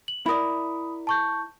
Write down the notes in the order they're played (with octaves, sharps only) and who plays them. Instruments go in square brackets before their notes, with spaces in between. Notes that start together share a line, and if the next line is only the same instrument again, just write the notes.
[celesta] F#7
[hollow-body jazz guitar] E4 A#4 D5 [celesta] B5 D#6
[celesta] A5 C#6 G6